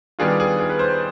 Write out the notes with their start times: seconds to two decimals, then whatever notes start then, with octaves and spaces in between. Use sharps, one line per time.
0.19 D#3 G3 B3 D4 F4 G#4
0.40 G#4
0.60 G#4
0.70 B4
0.79 C5